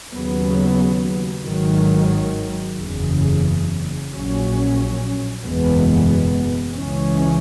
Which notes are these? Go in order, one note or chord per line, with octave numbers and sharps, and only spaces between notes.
D#2 C#3 F#3 B3
G#1 G#2 D#3 F#3
F#1 E2 C#3
A#1 A#2 F#3 C#4
F#1 E2 B2 G#3 B3
C#2 C#3 E3 G#3 C#4